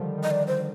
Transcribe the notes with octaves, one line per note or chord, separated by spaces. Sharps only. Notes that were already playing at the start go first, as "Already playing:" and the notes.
Already playing: D3 D#3 F3 G3
D#3
D#5
D#3 D5
C5